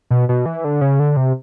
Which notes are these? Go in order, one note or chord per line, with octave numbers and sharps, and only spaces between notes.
B2
B2
E3
D3
C#3
D3
C3